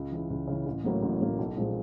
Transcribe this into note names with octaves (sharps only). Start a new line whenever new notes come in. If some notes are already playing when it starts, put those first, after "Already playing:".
Already playing: C#2
C#3 E3
C#2
C#3 E3
A1
A2 F#3 A#3
A1
A2 F#3 A#3
B1
A#2 F3 G#3 C4